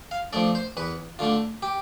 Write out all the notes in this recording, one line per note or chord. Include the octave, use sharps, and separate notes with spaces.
F5
F3 A3 D4 D5
C5
E2 B4
D3 A3 D4 F4
G4